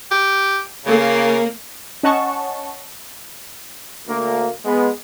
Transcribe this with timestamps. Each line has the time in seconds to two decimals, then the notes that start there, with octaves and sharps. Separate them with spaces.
0.11 G4
0.86 C#3 A#3 A#4
2.03 C#4 D#5 F#5 A5 C#6
4.07 D2 A#3
4.65 G#3 B3